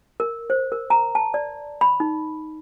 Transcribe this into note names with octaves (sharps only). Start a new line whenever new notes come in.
A#4
C5
A#4
A#5
A5
D5
B5
D#4